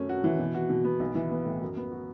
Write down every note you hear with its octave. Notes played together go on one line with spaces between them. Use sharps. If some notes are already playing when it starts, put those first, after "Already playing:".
Already playing: F#2 A3 C#4
F#4
E3
B2
F#4
B2
B3
B1
E3
B3
A2
F#2
B3
F#4